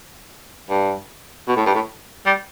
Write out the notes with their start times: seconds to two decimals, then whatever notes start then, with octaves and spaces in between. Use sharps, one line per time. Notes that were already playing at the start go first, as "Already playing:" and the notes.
0.70 G2
1.47 B2
1.56 A2
1.66 G2
1.75 A2
2.26 G3